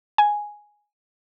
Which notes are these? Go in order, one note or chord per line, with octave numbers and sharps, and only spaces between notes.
G#5